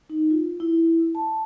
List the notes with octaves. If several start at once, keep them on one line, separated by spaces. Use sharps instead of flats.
D#4
F4
E4
A5